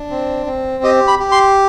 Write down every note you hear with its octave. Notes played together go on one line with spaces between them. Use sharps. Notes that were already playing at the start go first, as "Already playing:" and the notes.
Already playing: D4
C4
C4
G4 D#5
B5
G4
C6